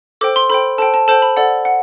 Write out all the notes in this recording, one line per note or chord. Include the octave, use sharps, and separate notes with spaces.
A4 C5 G5 D6
C6
A4 C5 G5 B5
A4 C5 G5 A5
A5
A4 C5 G5 A5
B5
A4 D5 F#5
F#5